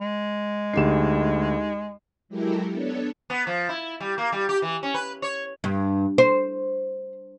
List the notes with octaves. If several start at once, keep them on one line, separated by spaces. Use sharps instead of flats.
G#3
D2 D#4 G4 G#4 C7 E7
F#3 G#3 E4 G4 A4 A#4
B3 D4 A4 C#5
B3
F3
E4
G3
A#3
G3
G4
E3
C#4
B4
C#5
G2
C5